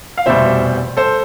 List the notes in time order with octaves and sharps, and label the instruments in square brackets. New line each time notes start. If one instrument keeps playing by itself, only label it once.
[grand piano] F5
F1 E2 B2 G3 C5 E5
A4 C5